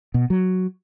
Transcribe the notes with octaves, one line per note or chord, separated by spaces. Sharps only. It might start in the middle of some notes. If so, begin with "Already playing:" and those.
B2
F#3